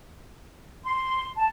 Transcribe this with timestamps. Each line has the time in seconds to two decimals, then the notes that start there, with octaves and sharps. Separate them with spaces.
0.84 C6
1.36 A5